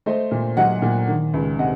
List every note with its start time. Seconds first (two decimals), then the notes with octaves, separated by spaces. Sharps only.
0.06 A3 C5 D#5
0.31 A#2
0.57 F#3 D#5 F#5
0.82 A#2
1.08 D#3
1.34 C#2
1.59 C3 D#5 F#5